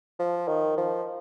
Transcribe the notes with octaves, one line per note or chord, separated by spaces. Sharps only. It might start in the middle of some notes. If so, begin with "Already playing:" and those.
F3
D#3
F3